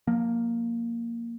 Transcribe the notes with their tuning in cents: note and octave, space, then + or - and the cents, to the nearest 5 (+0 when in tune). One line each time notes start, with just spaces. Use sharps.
F3 +35 A#3 +0